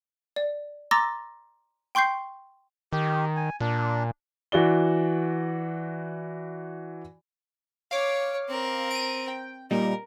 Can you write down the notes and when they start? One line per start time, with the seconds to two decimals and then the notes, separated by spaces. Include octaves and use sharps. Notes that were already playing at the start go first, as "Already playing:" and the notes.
0.36 D5
0.91 A#5 C6 D6 E6 A6 A#6
1.95 G5 C6 C#6 G6 C7
2.93 D#3 G4
3.36 G#5
3.60 A#2 D4
4.52 E3 F#4 D5 G7
7.91 C#5 F5 D6
8.48 C4 A#4
8.91 D7 D#7
9.28 G5
9.71 A#2 G3 D#4 A#4